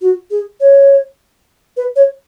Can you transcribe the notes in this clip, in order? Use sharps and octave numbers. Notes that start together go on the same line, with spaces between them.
F#4
G#4
C#5
B4
C#5